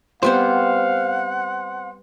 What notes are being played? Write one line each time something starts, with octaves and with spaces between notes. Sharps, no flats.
G3 B3 C4 C5 F5 F#5